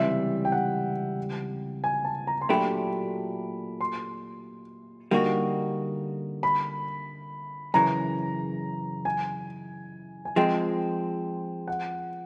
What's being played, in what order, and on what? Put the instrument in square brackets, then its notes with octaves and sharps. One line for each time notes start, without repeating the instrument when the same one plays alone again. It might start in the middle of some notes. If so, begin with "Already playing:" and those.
Already playing: [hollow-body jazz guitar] C#2 C3 E3 G3 [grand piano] E5
[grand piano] G5
F#5
G#5
A5
A#5
C6
[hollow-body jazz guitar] A#2 F#3 A3 D4 G4 [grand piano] B5
[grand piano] C6
[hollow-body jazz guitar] D3 G3 A#3 D#4 F#4
[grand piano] B5
[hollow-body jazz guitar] F#2 C#3 E3 [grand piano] A#5
[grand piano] G#5
G#5
[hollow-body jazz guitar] F3 G#3 C4 [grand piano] G5
[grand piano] F#5